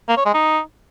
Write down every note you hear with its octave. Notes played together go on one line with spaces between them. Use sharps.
A#3
C#5
G#3
D#4